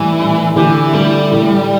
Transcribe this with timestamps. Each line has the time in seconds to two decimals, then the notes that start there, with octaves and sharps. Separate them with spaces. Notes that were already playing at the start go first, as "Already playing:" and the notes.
Already playing: A2 E3 G3 E4
0.19 A2 G3 E4
0.56 D3 E3 A3 E4 G4
0.93 D3 G3 A3 E4 G4
1.31 A2 E3 A3